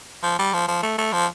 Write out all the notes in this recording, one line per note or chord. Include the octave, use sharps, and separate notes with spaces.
F3
G3
F3
F3
A3
A3
F3